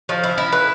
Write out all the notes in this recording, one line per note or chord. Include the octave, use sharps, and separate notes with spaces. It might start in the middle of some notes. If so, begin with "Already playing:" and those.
F3
E4
E4
B4